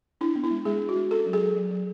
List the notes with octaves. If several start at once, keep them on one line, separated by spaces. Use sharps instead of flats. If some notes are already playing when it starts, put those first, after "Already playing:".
D4 E4
B3
E4
G#3
G#3 G#4
D4
F#4
G#3
C#4 A4
F#3
G#4
F#3
F#3
F#3